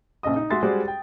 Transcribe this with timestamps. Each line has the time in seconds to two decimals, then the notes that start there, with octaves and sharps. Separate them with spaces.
0.23 A#1 C#3 D#5 D#6
0.36 D#4
0.50 G#3 F#4 G#4 E5 C6 A6
0.63 G3 G#3 F#4 G#4 C5 D5
0.88 G5